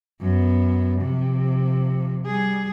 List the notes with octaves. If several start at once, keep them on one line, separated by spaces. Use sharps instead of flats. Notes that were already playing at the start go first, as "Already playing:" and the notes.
F#2 B3
C3 F3
G3 G#4